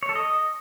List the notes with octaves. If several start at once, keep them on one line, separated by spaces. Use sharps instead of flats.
C#5
A4
D#5